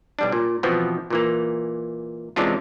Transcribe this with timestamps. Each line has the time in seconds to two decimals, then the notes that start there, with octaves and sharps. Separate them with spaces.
0.19 B1 G3 D4
0.32 A#2
0.63 B2 E3 F3 B3 C4
1.10 A#2 E3 A#3
2.36 C3 E3 G#3 C#4 D4 F4